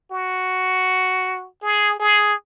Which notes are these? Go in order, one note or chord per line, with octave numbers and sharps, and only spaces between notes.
F#4
G#4
G#4